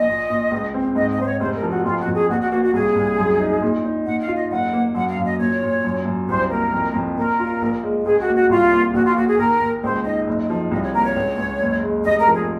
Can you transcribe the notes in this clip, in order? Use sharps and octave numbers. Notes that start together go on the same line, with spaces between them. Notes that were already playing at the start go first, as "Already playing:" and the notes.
Already playing: A#1 D#5
A#2
A#2
C#2
C4
G#2 D#5
D#5
G#2 C5
C#5
F1 C5
A#4
F3
F#4
F2 F4
F#4
F2
G#4
A#1 F#4
F#4
A#3 F#4
F#4
C2 G#4
C2
F#2
D#4
A#2
D#4
A#2 F#5
F5
F4
D#5
F#1 F#5
A#3
F#2 F#5
F5
F#2
D#5
A#2 C#5
A#2
F#2
F#2
C2 C5
A#3 A#4
F2
F2
A#2 A#4
F4
A#1
G#3
C#2 G#4
F#4
A#3
F#4
C2 F4
A#3
A#1 F#4
F4
A#3 F#4
G#4
D#2 A#4
D#2
C#2 C5
D#4 D#5
F#1
F3
C2 D#5
C#5
A#3 A#4
C#5
C#2
C#2
F#1
G#3
F1 D#5
A#4
F3
G#4